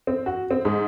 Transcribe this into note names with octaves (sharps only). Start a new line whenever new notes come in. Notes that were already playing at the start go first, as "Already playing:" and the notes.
C4
F#4
C4
G#2